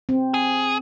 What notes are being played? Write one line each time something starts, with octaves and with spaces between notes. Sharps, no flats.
C4
G#4